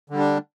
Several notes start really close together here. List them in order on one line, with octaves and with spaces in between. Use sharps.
D3 G3 D4